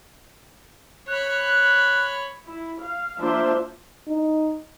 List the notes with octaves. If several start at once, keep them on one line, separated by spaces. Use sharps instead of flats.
C#5 B5 F#6
E4
F5
F3 A#3 D4 F4 C5 E5
D#4